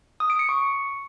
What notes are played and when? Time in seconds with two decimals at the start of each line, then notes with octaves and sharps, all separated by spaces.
0.20 D#6
0.30 D7
0.39 C#7
0.49 C#6